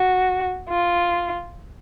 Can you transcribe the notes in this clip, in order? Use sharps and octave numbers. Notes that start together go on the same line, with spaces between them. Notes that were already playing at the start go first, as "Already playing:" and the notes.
Already playing: F#4
F4